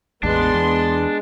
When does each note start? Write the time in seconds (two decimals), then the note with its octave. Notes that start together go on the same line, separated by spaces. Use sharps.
0.23 A1 E2 G#3 B3 D4 C6
0.54 E2